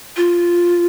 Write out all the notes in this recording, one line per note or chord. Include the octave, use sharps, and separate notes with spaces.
F4